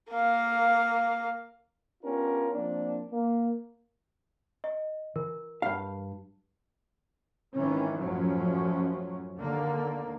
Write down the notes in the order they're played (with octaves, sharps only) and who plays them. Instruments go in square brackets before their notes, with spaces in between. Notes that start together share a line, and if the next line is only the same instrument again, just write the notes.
[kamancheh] A#3 F5
[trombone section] B3 C#4 D4 F4 G4 A#4
F3 A#3 C4 D4
A#3
[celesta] D#5
[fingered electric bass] E3 [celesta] A#4
[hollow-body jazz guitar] G2 F5
[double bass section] G#1 D#3 E3 C#4
A1 F#2 F3 F#3 C#4
D#2 D3 A#3